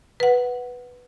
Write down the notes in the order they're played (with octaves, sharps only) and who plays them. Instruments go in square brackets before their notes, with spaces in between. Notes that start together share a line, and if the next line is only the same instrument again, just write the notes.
[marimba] B4 F#5